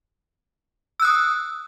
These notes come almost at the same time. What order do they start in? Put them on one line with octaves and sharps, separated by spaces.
E6 F#6 D#6